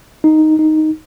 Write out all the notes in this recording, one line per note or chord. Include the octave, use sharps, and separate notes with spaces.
D#4
D#4